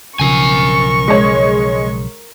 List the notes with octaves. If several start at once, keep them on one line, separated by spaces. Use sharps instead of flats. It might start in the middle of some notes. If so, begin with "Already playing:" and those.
B1 C#3 F3 A#4 G#5 C#6
G#3 C#5